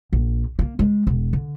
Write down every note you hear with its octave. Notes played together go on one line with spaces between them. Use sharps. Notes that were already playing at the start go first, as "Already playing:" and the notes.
A#1
A#3
G#3
E1
D3